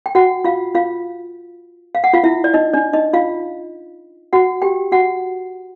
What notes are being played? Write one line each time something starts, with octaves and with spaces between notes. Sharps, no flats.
G5
F#4 F#5
F4 F5
F4 F5
F5
F#5
F4 F5
E4 E5
D5
D#4 D#5
D4 D5
D#4 D#5
F4 F5
F#4 F#5
G4 G5
F#4 F#5